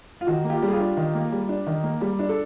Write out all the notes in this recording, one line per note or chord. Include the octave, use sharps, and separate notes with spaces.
F4
D#3 F#4
A#3
F4 G4
G3
G#4
F4 G4
D4
D#3
A#3
G3
D4
D#3
A#3
G3
D4
A4